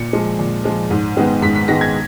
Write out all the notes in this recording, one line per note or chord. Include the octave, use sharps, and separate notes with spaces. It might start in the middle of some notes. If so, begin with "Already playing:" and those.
Already playing: A#2 C#7
F3 G#3
A#2
F3 G#3
G#2
D#3 G#3 B3
G#2 B6
B6
D#3 G#3 B3 A#6
G#6